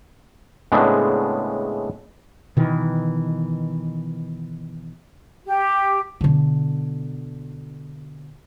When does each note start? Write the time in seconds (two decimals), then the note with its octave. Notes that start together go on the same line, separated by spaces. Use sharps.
0.72 A2 C#3 G#3 B3 C4 D4
2.57 B2 D#3 E3
5.46 G4
6.21 B2 D3